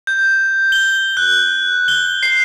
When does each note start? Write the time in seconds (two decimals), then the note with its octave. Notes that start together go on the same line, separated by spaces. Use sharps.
0.07 G6
0.72 G7
1.17 F#6
1.88 G7
2.23 C7